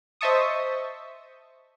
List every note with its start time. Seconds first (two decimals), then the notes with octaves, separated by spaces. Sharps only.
0.21 C5 D#5 E5 A5 C#6 D#6